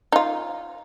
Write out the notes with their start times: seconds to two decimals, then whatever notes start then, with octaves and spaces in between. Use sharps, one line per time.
0.12 D#4 F4